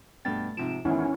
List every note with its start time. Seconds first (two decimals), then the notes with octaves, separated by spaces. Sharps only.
0.25 G2 B2 A3 G5 A6
0.57 G#2 C3 F3 D7 E7
0.85 E2 G#2 D#3 C#4 E4 F#5